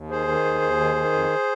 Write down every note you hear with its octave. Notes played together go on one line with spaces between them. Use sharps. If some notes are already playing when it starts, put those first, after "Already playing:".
Already playing: D#2
D#3 G#4 C5
D#3
D#2
D#2
D#3
D#3
F2